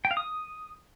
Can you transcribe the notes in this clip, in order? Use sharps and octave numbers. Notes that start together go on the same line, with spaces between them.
G5
F5
D#6